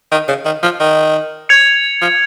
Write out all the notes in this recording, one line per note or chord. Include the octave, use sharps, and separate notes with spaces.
D#3
C#3
D#3
F3
D#3
G#6 C#7 F7
F3